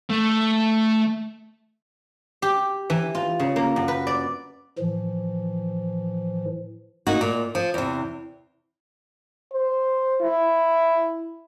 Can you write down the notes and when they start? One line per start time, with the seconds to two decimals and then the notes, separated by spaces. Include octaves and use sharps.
0.10 A3
2.42 G4
2.90 E3
3.15 F4
3.39 C#3
3.56 A#3
3.76 F#2
3.88 B4
4.07 D5
4.79 A2 E3 F3
7.07 A#3 D#4 F#4
7.21 A#2
7.55 F3
7.74 E2 C3
9.52 C5
10.21 E4